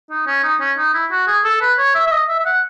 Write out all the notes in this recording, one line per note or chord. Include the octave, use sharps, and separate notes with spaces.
D#4
C#4
D#4
C#4
D#4
E4
F#4
G#4
A4
B4
C#5
E5
E5
D#5
E5
E5
F#5